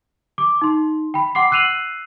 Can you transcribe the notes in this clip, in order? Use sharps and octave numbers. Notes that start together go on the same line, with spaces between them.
D6
D#4 C6
G5 B5
F#5 C6 D6 C7
E6 F#6 C7 D#7 F7 F#7